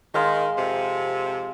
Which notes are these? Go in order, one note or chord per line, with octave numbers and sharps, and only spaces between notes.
D#3 G#3 F5 C6
F2 C3